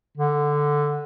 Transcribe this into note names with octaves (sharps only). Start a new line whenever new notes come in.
D3